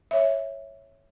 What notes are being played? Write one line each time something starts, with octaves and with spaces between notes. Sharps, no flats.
C#5 E5